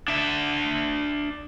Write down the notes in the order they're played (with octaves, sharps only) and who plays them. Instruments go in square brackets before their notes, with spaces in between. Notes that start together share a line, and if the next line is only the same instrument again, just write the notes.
[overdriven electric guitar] D4 E5